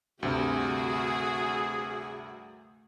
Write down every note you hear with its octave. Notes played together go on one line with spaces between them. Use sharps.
D2 G2 C3 A3 F#4 G#4